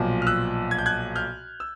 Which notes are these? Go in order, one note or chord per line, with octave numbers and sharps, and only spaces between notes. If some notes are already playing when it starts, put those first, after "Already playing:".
Already playing: B1 A#2 F3
F6
E6 F#6
G#6
G6
F#6 G#6
F6 G6
E6